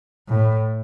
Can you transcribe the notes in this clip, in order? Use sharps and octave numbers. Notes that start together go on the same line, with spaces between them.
A2